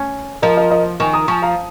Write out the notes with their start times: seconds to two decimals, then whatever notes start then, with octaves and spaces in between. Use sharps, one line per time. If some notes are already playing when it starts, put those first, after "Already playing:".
Already playing: C#4
0.42 F3 A#4 D#5
0.57 A#4 D#5
0.70 A#4 D#5
1.00 D#3 G#5 C#6
1.13 A#5 D#6
1.28 F3 G#5 C#6
1.42 F5 A#5